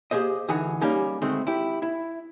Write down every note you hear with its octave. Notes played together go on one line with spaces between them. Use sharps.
A#3 G4 G#4 C5 D#5
D2 E3 D#4 G#4 A4 F#5
G3 A#3 C#4 D#4 G#4
D2 D#3 G#3 A3 C4
E4 G4
E4